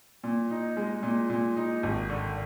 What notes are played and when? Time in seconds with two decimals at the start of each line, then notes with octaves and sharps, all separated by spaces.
0.24 A#2
0.51 D#4
0.77 G#3
1.03 A#2
1.30 A#2
1.57 D#4
1.83 G#1
2.10 D3